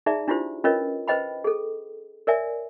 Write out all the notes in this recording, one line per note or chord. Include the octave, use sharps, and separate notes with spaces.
D#4 G#4 D5 E5 A#5
D4 E4 F4 G4 C5
C#4 F4 A#4 B4 C#5 D#5
B4 C5 D#5 G5 B5
G#4 A4
A#4 C#5 D5 E5 G#5